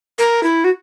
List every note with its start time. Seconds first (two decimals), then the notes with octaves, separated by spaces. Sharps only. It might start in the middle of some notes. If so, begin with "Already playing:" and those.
0.18 A#4
0.43 E4
0.64 F#4